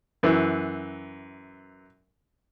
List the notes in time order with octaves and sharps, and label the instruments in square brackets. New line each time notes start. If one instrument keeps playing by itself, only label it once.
[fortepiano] F#2 E3